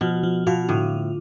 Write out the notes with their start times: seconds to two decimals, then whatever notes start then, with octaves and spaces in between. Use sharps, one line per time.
0.01 B2 F3
0.23 F3
0.47 B2 F4
0.69 A2 D3